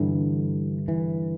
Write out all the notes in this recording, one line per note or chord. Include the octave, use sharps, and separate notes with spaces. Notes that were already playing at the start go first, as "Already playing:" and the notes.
Already playing: G2 D3 E3
E3